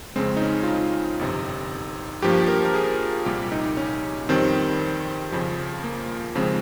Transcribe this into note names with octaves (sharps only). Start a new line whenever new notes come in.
F2 C#3 G#3 C4
D#4
C#4
F4
D#4
G1 F2 C3
G2 F3 A#3 G4
A#4
A#4
G#4
C2 A#2 G3 A#3 G4
D#4
C#4
F2 D#3 G3 C4
F2 C#3 F3
A#3
D#2 C#3 F3 G#3 C4